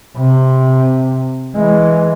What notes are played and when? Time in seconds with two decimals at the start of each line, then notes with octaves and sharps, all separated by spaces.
0.17 C3
1.55 E3 G#3